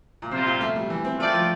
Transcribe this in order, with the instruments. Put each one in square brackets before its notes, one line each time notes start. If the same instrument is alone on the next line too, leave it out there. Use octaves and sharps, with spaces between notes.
[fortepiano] A#2
[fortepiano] C3 [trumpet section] G3 A#3 F4 C5
[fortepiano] A#2
A3
G3
E3
C4
[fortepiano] A3 [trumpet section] F4 A4 D5 G5
[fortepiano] F3